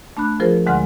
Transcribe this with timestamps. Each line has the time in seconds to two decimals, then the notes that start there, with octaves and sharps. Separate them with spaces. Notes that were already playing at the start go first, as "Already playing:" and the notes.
0.17 A3 D4 B5 F#6
0.40 F3 F4 G#4 A#4 C5
0.66 D2 D3 G#3 F#5 C6 F6